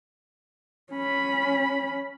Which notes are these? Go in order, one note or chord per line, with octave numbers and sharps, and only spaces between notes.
C#4 B5